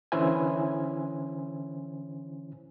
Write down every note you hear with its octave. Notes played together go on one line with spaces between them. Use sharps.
D3 E3 C#4 E4 C5 G#5